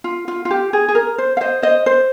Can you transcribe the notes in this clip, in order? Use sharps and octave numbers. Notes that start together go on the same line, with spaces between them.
F4
F4
F4
G4
G#4
G#4
A#4
C5
F5
C5 D#5
C5 D#5
C5